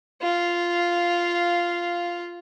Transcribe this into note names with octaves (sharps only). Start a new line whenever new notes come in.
F4 F5